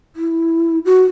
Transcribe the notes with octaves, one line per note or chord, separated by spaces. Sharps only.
E4
F#4